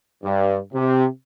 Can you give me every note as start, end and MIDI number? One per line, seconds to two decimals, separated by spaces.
0.24 0.58 43
0.73 1.05 48